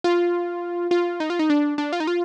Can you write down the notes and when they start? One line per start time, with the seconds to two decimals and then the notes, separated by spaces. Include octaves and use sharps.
0.04 F4
0.91 F4
1.20 D#4
1.30 F4
1.39 D#4
1.50 D4
1.78 D4
1.93 F4
2.00 D#4
2.07 F4